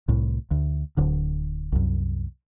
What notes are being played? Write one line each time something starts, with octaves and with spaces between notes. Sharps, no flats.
C2 A2
D2
D1 D3
C2 F#2